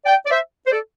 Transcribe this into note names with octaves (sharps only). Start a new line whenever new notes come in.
D5 G5
D5
C5 E5
C5
A4 D5